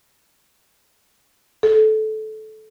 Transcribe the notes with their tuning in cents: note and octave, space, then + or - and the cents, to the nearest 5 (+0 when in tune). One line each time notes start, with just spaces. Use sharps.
A4 -20